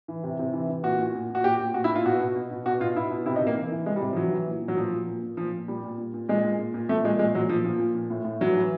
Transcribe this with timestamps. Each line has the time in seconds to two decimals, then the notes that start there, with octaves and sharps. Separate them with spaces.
0.08 E3
0.24 C3
0.39 C3
0.53 E3
0.69 E3
0.83 A#2 F#4
0.99 A#2
1.15 A#2
1.30 A#2 F#4
1.44 A#2 G4
1.59 A#2
1.74 A#2 F#4
1.84 E4
1.90 A#2
1.96 F4
2.06 B2 F#4
2.21 B2
2.35 B2
2.51 B2
2.66 B2 F#4
2.80 B2 F4
2.96 B2 E4
3.11 B2
3.26 C3 E4
3.36 D#4
3.41 C3
3.47 A#3
3.57 E3
3.72 E3
3.86 C3 G#3
3.96 G3
4.02 C3
4.13 F3
4.16 E3 F#3
4.32 E3
4.47 A#2
4.62 A#2
4.68 F#3
4.77 A#2 F3
4.92 A#2
5.07 A#2
5.23 A#2
5.37 A#2 F3
5.53 A#2
5.68 A#2 G3
5.83 A#2
5.98 A#2
6.14 A#2
6.29 A#2 G#3
6.44 A#2
6.59 A#2
6.74 A#2
6.89 A#2 A3
7.04 A#2 G#3
7.19 A#2 G#3
7.34 A#2 F#3
7.49 A#2 F3
7.64 A#2 F3
7.79 A#2
7.95 A#2
8.10 A2
8.25 A2
8.41 E3 F#3
8.56 E3